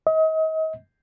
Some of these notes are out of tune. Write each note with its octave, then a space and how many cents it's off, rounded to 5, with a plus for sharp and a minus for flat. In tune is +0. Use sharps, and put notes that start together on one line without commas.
D#5 +35